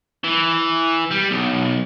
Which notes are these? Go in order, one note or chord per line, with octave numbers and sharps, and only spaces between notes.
E3
G3
B1